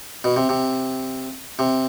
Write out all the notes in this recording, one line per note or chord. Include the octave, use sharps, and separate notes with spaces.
B2
C3
C3
C3